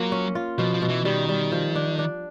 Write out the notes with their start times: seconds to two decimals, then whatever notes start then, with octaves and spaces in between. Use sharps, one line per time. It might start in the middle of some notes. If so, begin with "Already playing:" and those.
Already playing: F#3 A#3 F4
0.12 C#4
0.35 F4
0.59 B2 F3
0.74 F3
0.82 B2
0.89 E3
1.05 D#3 G3
1.29 G3
1.52 F3
1.75 D4
1.99 D4